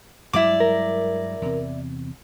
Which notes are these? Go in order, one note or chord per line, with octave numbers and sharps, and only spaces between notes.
G2 F#3 G#3 E4 D5 D6
A#4
E2 C3